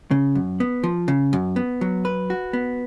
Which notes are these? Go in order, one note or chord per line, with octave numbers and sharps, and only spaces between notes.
C#3
F#2
B3
F3
C#3
F#2
B3
F#3
B4
F#4
B3